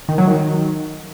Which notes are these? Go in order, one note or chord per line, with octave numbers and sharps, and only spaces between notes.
D#3
F#3
D#3